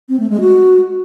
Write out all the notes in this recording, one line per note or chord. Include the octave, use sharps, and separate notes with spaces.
C4
A3
G#3
F#4